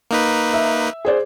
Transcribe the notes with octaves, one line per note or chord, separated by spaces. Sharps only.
A#3 D#4 B4
E5
G#4 C5 D5